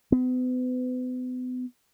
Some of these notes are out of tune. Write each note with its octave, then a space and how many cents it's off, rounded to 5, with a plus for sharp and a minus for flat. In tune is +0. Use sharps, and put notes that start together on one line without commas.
B3 +40